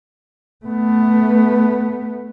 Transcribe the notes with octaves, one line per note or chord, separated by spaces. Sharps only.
A3 B3